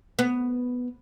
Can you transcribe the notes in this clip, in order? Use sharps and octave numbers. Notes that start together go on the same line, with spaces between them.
B3